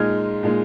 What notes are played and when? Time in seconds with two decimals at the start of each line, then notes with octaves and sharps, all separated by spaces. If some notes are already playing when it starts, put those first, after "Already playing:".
Already playing: A#2 G#3 D#4 F6 G#6
0.43 A#2 G#3 D#4